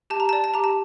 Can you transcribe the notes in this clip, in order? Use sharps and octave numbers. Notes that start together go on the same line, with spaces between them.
G4 A5
A#5
A5
D5
A5
G4 A#5
A5